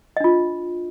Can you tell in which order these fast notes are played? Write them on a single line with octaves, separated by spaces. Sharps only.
D#5 D4 F4